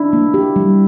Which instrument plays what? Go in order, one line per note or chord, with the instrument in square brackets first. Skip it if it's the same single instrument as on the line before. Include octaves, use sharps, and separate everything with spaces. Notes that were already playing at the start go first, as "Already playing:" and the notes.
Already playing: [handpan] D4 [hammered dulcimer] E4
[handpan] A#3
G4
G3